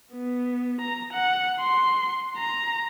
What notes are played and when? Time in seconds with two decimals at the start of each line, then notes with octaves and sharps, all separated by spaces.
0.13 B3
0.81 A#5
1.13 F#5
1.60 C6
2.37 A#5